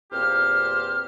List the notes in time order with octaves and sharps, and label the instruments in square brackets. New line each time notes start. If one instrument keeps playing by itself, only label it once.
[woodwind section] E2 A#2 C4 G4 C5 F6